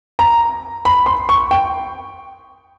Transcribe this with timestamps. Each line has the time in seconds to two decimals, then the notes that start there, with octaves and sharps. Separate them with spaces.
0.19 A#5
0.85 B5
1.06 C6
1.29 C#6
1.51 G5